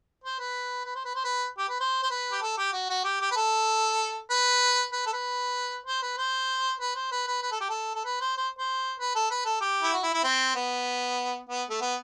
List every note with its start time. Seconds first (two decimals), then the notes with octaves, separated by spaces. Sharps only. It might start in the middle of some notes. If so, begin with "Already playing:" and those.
0.24 C5
0.39 B4
0.85 B4
0.95 C5
1.05 B4
1.15 C5
1.24 B4
1.58 G4
1.69 B4
1.80 C5
2.03 C5
2.11 B4
2.32 G4
2.42 A4
2.58 G4
2.73 F#4
2.90 F#4
3.05 G4
3.21 G4
3.32 B4
3.36 A4
4.30 B4
4.93 B4
5.06 A4
5.13 B4
5.86 C5
6.03 B4
6.18 C5
6.80 B4
6.96 C5
7.12 B4
7.27 B4
7.43 B4
7.52 A4
7.60 G4
7.70 A4
7.95 A4
8.05 B4
8.21 C5
8.37 C5
8.59 C5
9.00 B4
9.15 A4
9.31 B4
9.46 A4
9.61 G4
9.83 E4
9.94 F#4
10.04 E4
10.14 E4
10.24 C4
10.55 B3
11.50 B3
11.70 A3
11.81 B3